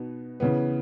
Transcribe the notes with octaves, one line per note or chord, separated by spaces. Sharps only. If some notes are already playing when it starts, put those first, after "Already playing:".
Already playing: B2 B3 D#4
C#3 E3 B3